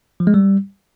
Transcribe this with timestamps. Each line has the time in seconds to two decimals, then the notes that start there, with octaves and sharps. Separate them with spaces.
0.20 F3
0.27 G#3
0.34 G3